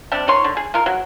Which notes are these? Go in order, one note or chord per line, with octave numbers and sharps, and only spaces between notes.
C3 G3 D4
D#3 F3 C#5 C6
D3
G#4
G#3 F4 A#4
F#3